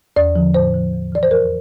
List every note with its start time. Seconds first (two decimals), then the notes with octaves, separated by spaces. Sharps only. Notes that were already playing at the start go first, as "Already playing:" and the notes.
0.16 E2 D5
0.36 D3 F3
0.54 A2 C5
0.74 F3
0.93 E2
1.12 E3 D5
1.23 C5
1.31 F2 A#4